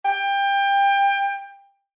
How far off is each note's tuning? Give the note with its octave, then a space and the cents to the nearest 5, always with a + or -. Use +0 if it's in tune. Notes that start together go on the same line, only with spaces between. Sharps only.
G5 +25